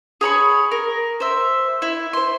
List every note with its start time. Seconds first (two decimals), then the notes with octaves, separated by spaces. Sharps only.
0.21 G#4 C#5 B5 C#6
0.71 A#4
1.20 C5 E5
1.82 E4
2.13 C5 C6